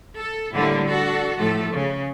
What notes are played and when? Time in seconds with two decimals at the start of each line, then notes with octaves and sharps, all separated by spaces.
0.17 A4
0.54 A2 D3 G3 A#3 D4 E4
0.87 D4 F#4 A4
1.36 A2 F3 A3 A4
1.72 C#3